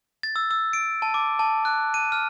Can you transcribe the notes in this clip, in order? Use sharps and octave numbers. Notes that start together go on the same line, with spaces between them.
A6
E6
E6
D7
A5
D6
A5
F#6
D#7
F6